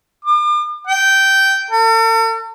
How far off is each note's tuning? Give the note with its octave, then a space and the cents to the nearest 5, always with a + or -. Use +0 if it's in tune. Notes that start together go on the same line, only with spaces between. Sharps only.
D6 +40
G5 -10
A4 +45